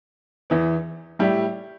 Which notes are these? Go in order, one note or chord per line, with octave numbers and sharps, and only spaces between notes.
E2 E3 B3
A2 G3 E4 G4